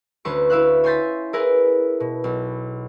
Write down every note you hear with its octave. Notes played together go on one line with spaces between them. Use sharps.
D2 C#4 B4 C5 C#6
E4 B4 E5 F5 F#6
C#5 G#5 C6 G6 A6 B6
E4 G#4 A#4 B4 G#5
B2
B1